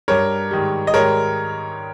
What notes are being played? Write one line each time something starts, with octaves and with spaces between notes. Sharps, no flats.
G2 G3 A#4 C#5
G#2 D#3 G3
D#5
G#2 D#3 G3 A#4 C#5